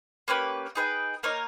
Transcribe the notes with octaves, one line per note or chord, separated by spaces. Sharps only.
A#3 C#4 G4 B4
D#4 G#4 B4 G5
A#3 D#4 A#4 C#5